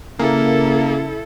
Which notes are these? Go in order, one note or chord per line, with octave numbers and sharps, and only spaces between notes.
C#3 A#3 E4 A4